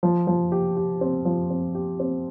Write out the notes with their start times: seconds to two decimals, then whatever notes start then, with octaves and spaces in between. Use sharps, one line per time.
0.03 F3
0.27 F3
0.52 G4
0.77 G4
1.01 C4
1.25 F3
1.50 C4
1.75 G4
2.00 C4